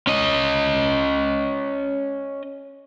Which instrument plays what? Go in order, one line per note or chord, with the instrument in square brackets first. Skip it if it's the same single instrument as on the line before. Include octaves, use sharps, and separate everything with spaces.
[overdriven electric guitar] C#4 D#5